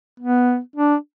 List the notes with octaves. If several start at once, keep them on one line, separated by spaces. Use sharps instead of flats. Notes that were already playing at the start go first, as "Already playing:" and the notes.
B3
D4